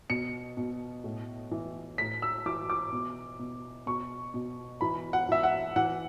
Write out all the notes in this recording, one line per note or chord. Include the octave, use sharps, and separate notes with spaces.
B2 C#7
B2
A2
E3
A2 B6
E6
E3 D6
D6
B2
B2
B2 C#6
B2
E3 B5
F#5
E3 E5
F#5
E3 F#5